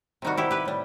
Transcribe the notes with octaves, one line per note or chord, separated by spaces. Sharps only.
C3 D#3 G3 D#4 F#4
E4 G4
G4 B4
A2 G3